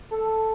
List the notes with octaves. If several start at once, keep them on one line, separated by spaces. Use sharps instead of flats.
A4